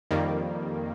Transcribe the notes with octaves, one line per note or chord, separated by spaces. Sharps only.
F2 D#3 G3 A#3